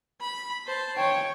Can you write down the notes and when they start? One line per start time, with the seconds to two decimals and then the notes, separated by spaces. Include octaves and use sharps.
0.21 B5
0.67 C5 A5
0.97 C#5 G5